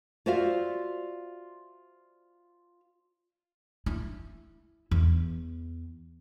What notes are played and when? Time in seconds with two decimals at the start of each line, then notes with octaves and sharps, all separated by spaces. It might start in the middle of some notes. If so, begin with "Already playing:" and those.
0.26 F4 F#4 C5 D5 E5 F5
3.86 E4
4.91 E2